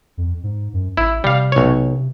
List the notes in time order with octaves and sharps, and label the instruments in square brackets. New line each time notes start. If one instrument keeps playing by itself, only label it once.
[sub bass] F2
G#2
F#2
[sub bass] A1 [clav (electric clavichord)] E4
[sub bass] C3 [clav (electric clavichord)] G3 F5
[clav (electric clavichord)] B1 C#5